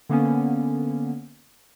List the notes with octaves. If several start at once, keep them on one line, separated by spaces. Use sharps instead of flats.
D3 A#3 B3 C#4